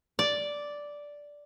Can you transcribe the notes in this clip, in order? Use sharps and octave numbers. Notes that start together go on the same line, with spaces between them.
D5